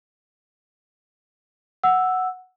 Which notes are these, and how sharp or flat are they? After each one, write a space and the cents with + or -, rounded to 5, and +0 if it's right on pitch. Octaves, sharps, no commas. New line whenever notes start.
F#5 +0 E6 +0